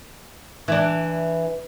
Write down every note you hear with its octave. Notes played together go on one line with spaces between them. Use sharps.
E3 D4